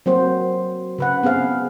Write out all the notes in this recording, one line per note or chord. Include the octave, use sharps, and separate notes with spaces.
F#3 A#3 C4 F#4 C5
C#3 B4 F#5
B3 C4 G#4 F5